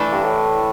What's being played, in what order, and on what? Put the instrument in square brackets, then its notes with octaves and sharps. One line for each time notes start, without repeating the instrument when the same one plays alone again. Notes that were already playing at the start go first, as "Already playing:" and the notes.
Already playing: [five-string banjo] E3 A3 D4
[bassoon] G2
A2